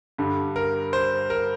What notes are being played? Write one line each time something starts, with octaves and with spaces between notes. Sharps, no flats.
G2 D3 G3
A#4
C5
A#4